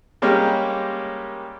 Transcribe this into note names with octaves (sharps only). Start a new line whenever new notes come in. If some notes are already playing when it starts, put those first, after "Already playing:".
G3 G#3 A#3 C#4 G4